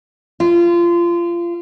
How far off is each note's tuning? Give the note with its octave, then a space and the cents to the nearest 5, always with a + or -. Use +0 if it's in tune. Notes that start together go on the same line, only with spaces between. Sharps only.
F4 -25